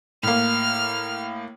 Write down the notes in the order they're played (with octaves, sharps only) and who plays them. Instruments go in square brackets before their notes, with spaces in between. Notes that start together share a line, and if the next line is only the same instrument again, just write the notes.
[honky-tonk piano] A2 A#3 [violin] F6